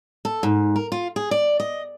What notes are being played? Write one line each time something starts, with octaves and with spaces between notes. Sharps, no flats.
A4
G#2
A#4
F4
G#4
D5
D#5